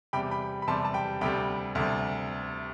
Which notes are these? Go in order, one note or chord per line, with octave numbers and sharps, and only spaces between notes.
E2 C3 G3 G5 B5
G5 B5
B5
E2 C3 G3 A5 C6
A5
G5 B5
D2 C3 G3 G5 B5
D2 C3 G3